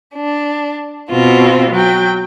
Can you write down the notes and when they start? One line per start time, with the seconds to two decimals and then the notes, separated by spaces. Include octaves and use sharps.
0.15 D4
1.10 B2 C4 F4 F#4
1.71 F#3 G5